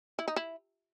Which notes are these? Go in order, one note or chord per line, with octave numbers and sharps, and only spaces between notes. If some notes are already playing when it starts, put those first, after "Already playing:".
E4
D#4
E4